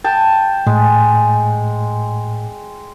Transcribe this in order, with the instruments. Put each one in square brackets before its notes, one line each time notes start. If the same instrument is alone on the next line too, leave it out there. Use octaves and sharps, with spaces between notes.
[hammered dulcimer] G5 A5
[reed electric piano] A2 [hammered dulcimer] G#3